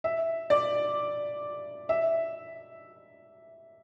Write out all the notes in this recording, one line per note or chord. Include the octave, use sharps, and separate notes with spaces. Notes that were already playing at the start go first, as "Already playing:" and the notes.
E5
D5
E5